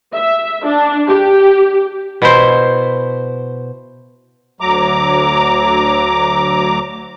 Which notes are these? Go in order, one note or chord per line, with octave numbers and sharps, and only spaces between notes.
E5
D4
G4
B2 E4 C5
D2 F#3 A#5 D6